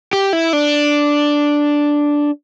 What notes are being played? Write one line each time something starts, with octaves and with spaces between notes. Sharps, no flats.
G4
E4
D4